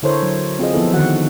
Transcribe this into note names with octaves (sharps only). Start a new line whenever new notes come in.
D3 E4 A4 A#4 C5 C#5
F#3
C4 F4 G#4 D#5
F3 B3 E4 A4
D3 D#3 F#4 F#5